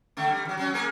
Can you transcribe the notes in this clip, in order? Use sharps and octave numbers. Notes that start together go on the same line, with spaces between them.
D3 A3 D4
G3
D#3 F#3
F#3 C#4
A#3 G#4 A#4